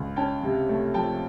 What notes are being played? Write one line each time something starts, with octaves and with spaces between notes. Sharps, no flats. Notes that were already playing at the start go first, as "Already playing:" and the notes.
Already playing: C#2
C#4 G5 A5
C3
A3
F3 G5 A5